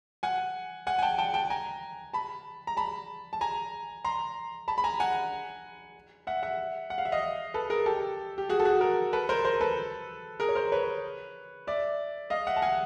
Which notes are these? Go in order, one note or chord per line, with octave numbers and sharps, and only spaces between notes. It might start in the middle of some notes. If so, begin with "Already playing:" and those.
F#5 G#5
F#5 G#5
G#5
G5 A5
G5 A5
G5 A5
G#5 A#5
A5 B5
A#5
A5 B5
A5
G#5 A#5
A#5 C6
A5 B5
B5
G#5 A#5
F#5 G#5
E5 F#5
E5 F#5
F#5
F5
E5
D#5 F5
A4 B4
G#4 A#4
G4 A4
G4
F#4 G#4
A4
F#4 G#4
G#4 A#4
A4 B4
A#4 C5
A#4 C5
A4 B4
G#4 A#4
C#5
A#4 C5
B4 C#5
D5 E5
D#5 F5
E5 F#5
A5
F#5 G#5